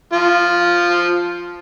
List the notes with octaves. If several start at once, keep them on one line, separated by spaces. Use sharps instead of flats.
F3 F4